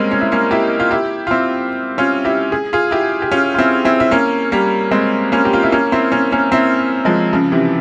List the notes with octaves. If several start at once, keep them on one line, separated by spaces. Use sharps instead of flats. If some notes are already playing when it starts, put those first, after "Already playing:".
Already playing: G3 G#3 A#3 C4 C#4
C#4
E4
A#3 C#4
E4 G4
F4
E4 G4
F4
C4 E4
C#4 F4
E4 G4
G#4
F4 G#4
E4 G4
G4
C#4 F4
F4
C4 E4
C4 E4
E4
A#3 C#4
G3 A#3
G#3 C4
A#3 C#4
G4
F4
E4
A#3 C#4
C4 E4
A#3 C#4
A#3 C#4
C4 E4
F3 G#3
C#3 F3
C3 E3